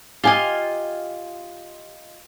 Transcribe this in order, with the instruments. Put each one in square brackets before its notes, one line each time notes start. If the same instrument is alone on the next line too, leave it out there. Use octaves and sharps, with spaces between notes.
[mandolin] F4 D#5 [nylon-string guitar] G4 G#5